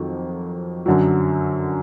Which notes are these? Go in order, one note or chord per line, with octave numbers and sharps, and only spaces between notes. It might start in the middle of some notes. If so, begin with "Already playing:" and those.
Already playing: F2 D#3 F#3
F#2 D3 F#3